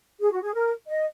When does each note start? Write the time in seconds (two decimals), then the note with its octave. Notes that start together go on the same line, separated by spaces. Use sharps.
0.20 G#4
0.32 F#4
0.42 G#4
0.54 A#4
0.87 D#5